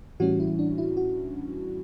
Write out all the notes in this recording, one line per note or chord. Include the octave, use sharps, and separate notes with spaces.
A2 E3 G3 C#4 F#4
E4
D4
E4
F#4